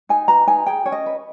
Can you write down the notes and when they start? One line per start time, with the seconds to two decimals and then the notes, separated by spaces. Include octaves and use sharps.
0.09 D#4 G#5
0.28 B4 A#5
0.47 D#4 G#5
0.66 G#4 G5
0.86 C#4 C#5
0.92 D#5
1.06 B4